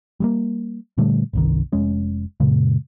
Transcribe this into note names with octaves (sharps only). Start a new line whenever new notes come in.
G3 G#3 A#3
A#2 D3 G3 A3
G1 C2 D#3
F1 G#3 C#4
F#2 A#2 C#3 G#3